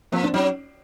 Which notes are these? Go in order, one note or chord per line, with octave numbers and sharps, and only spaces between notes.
F3 A#3 C4
C4 D4
F#3 C#4 D#4